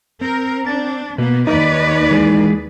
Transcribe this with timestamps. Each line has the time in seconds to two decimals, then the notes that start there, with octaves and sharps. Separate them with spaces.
0.21 C4 A#4
0.67 D4 A6
1.18 B2 A#3 B3 B4
1.47 D#2 D#4 B4 D5 D#5
2.11 E3 G#3 G#4